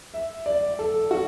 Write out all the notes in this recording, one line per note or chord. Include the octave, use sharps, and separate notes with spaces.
E5
D5
A4
F#4